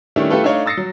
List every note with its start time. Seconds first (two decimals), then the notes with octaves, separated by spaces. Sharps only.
0.16 D#3 G3 A3 C#4 D4 E4
0.30 A3 E4 F4 G4 A4 B4
0.44 A3 D4 D#4 C#5 F5
0.66 D#6 E6 A6 A#6 C7 C#7
0.77 F#3